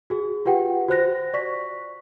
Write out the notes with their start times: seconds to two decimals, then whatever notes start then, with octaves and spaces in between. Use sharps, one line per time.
0.10 F#4 G#4
0.46 F4 G4 B4 F#5 G5
0.88 F#4 C5 F#6 A#6
1.34 D5 C#6 B6